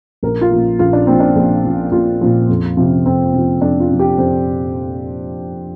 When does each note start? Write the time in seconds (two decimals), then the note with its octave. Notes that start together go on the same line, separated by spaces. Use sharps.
0.23 A#1 A#4
0.41 F4
0.52 A#2 F3
0.79 A#1 F4
0.93 D4
1.07 A#2 F3 C4
1.20 D4
1.36 A#1
1.65 A#2 F3
1.92 A#1 F4
2.21 A#2 F3
2.49 F2
2.77 C3 F3
3.05 F2 C4
3.34 C3 F3
3.61 F2 D4
3.80 F4
3.91 C3 F3
3.99 G4
4.18 F2 C5